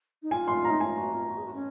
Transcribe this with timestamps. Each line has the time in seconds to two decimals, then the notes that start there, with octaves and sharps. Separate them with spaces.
0.23 D#4
0.31 F4 G#5
0.48 C6
0.65 A#5
0.70 D#4
0.80 F4 G#5
0.97 F#4
1.13 F4
1.30 F#4
1.38 G#4
1.46 F#4
1.54 C#4